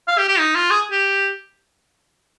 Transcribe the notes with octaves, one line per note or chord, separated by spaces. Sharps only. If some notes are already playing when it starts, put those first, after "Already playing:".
F5
G4
G4
D#4
F4
G#4
G4